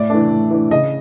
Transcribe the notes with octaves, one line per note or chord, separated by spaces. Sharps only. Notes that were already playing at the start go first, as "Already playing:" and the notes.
Already playing: A2 D5
E3 A3 D4
A2
E3 A3 D4
C#3 D#5